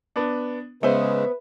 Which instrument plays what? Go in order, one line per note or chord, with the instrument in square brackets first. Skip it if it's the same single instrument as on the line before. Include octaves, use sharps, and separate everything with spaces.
[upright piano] B3 D4
[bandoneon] C#3 G#3 [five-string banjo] B3 C5 [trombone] B4 [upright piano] E5